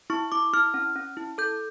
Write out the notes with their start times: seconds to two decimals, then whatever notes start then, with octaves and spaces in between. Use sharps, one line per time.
0.10 E4 C#6
0.32 E4 D6
0.54 E4 F6
0.74 C#4
0.96 C#4
1.17 E4
1.38 A4 G6